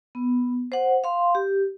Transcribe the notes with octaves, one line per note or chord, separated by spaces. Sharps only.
B3
C5 F#5
F5 C6
G4